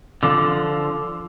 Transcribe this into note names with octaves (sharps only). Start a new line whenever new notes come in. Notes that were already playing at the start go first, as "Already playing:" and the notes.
D3 F3